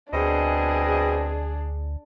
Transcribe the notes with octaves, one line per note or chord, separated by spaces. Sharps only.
D2 B2 C4 D4 G#4 D#5